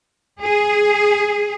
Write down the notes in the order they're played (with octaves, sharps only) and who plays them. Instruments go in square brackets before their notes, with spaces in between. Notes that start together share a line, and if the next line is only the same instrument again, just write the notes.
[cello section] G#4